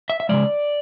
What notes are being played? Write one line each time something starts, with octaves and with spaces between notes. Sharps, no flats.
E5
E5
C#3 E3 G#3 D5